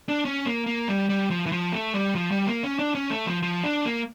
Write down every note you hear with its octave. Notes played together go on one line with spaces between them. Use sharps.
D4
C#4
A#3
A#3
G3
G3
F3
E3
F3
A3
G3
F3
G3
A#3
C#4
D4
C#4
A3
F3
F3
D4
A#3